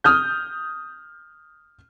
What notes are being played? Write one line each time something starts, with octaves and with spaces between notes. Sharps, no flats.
D#6 F6 G6